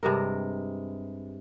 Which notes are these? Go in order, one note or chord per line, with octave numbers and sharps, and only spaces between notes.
G2 C3 G#3 A#4